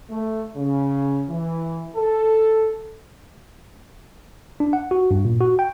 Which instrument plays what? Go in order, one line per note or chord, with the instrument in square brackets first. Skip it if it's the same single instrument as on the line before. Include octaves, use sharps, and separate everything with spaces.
[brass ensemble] A3
C#3
E3
A4
[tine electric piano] D4
F#5
F#4
G2
A#2
F#4
G5